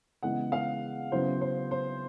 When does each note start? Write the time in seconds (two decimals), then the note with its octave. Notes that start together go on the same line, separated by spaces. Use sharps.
0.23 C#3 E3 G#3 B3 E4 F#5
0.52 F5
1.12 C#3 F#3 B3 E4 C5
1.41 C5
1.71 C5